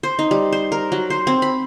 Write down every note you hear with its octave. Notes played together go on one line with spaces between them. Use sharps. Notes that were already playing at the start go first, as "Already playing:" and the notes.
C5
D#4
G3
C5
A#4
F#3
C5
C4
B5